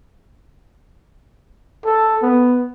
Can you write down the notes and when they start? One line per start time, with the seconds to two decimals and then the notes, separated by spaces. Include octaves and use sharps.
1.85 A4
2.23 B3